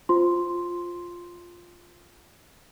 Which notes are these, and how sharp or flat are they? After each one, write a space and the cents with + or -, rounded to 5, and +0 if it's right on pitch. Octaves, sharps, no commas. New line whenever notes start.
F4 +0 C5 +0 C6 +0